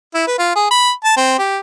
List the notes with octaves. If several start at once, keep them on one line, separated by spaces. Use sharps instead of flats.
E4
B4
F4
G#4
B5
A5
C4
G4